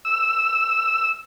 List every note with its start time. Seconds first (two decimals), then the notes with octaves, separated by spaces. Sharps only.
0.05 E6